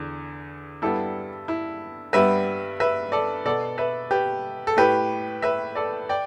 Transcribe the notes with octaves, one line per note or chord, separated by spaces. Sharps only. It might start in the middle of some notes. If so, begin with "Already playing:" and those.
Already playing: E2 D3
G2 G3 B3 E4 A4
E4
G2 G3 B3 B4 E5
B4 E5
A4 D5
B2 B3 A4 D5
B4 E5
G4 B4
A4
A2 A3 G4 B4
B4 E5
A4 D5
D5 G5